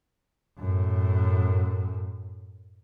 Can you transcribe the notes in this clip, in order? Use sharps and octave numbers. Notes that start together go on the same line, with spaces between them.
F#2 A2